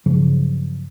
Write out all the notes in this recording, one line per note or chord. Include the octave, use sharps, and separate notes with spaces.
G2 C#3 F3 F#3